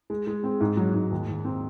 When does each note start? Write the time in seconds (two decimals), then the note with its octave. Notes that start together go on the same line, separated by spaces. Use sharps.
0.10 G#3
0.27 G#3
0.44 C4
0.61 G#2
0.77 F#3
0.94 G#2
1.11 D#2
1.29 D#2
1.45 C4